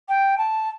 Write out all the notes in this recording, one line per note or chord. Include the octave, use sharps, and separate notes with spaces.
G5
A5